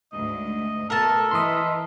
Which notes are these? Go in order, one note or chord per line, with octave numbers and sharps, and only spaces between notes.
D2 G#2 D#5
B2 A3 A4 A#4 A5
E3 D#5 C6